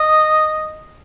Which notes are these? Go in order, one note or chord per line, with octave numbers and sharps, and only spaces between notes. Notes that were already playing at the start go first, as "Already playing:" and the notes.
Already playing: D#5